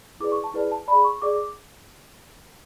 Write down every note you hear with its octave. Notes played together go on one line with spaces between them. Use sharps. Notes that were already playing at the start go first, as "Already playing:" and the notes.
E4 G#4 B4 D5 D6
C#6
A5
E4 G#4 B4 D5
A5
G#4 D5 B5
C#6
G#4 D5 D6
D6